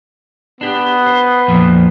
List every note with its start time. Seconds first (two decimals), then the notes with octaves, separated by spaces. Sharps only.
0.61 B3 D4 G4
1.06 C5
1.48 F2 A#2 F3